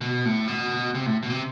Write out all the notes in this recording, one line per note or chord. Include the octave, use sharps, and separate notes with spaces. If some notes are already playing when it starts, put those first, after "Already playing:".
B2
A2
B2
C3
A2
B2
C3